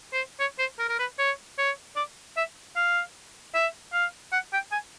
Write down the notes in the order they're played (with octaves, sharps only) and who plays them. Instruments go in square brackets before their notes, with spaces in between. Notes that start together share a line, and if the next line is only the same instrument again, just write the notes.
[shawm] C5
C#5
C5
A#4
A#4
B4
C#5
C#5
D5
E5
F5
E5
F5
F#5
G5
G#5